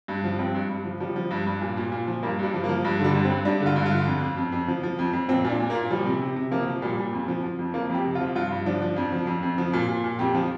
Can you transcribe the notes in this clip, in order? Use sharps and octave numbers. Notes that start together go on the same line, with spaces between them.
G2
F3
G2 C4
G2
G2
F3
F3 G3
F3
G2
G2
A#2
A#2
A#2
F3
G2 A#3
G2 G3
F3
A#3
F3
G2
D3 G3
G2
C4
G2
G2 D4
D3
F4
G2
F4
D3
F2
F2
F2
F2
F3
F3
F2
F2
A#2 C4
A#2 D4
A#2
A#3
A#2
F3 G3
C3
C3
C3
F3 A#3
F3
A#2 G3
A#2
F2
F3
F3
F2
F3 A#3
F2
G4
C3
F4
F3
G2 F4
G2
F3 D4
F3
F2
F3
F2
F2
F3
A#2
A#2
A#2
F2 G4
F3